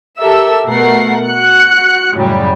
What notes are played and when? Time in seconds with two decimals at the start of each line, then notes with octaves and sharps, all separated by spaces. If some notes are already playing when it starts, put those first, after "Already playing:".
0.19 G4 A4 A#4 E5 E6
0.66 B2 A3 A#4 F#5 C7
1.25 F#4 F#6 C#7
2.16 F#2 A2 C#3 F#3 G3